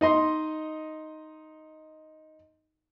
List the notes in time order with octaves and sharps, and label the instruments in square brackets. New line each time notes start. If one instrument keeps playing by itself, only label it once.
[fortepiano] D#4 D#5 C6